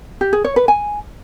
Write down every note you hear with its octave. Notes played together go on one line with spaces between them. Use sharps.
G4
G#4
C#5
B4
G#5